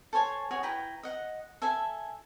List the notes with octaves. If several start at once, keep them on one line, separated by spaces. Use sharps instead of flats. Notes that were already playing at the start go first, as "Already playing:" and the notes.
A4 C5 C#5 G#5
F#4 G#4 C#5
E4 B4 G5 A#5
D#5 F#5
A4 E5 G#5